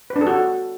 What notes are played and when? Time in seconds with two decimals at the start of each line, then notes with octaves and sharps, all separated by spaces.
0.10 B4
0.16 D4
0.21 A4
0.27 F#4